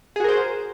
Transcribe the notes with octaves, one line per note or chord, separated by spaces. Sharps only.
F#4 G#4 A#4 C5